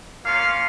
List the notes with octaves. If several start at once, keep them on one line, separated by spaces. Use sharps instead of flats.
A#3 C#4 F4 F5